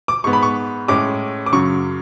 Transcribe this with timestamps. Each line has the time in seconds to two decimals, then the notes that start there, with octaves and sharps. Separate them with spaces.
0.08 D6
0.24 G#2 G#3 B3 C#6
0.33 B5
0.43 C#6
0.88 A2 G#3 C#4 D6
1.46 D6
1.53 F#2 C#3 F#3 C#6